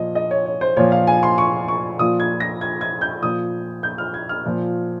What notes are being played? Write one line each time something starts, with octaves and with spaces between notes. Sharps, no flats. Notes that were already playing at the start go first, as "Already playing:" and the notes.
Already playing: A#2 F3 D#5
D#5
C#5
C#5
C5
A#2 F3 C#5
F5
G#5
C6
C#6
C#6
A#2 F3 D#6
G#6
A#6
G#6
G#6
G6
A#2 F3 D#6
G6
F6
G#6
F6
A#2 F3